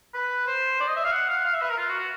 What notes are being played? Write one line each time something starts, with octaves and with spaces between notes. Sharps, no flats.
B4
C5
D5
D#5
E5
F5
F#5
F5
F5
E5
B4
A#4
F4
F#4
F#4